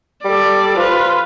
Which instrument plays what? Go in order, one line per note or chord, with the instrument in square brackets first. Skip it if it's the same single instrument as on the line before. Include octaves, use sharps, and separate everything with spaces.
[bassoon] G3 [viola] A4 D5
[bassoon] F3 [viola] F4 B4